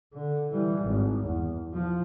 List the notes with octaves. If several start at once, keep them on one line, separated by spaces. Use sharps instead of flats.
D3
E3 G3
G#1
E2
F3